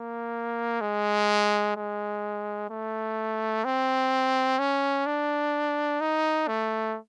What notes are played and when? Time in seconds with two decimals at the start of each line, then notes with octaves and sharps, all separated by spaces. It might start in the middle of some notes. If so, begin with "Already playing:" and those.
Already playing: A#3
0.81 G#3
1.76 G#3
2.70 A3
3.64 C4
4.59 C#4
5.06 D4
6.01 D#4
6.48 A3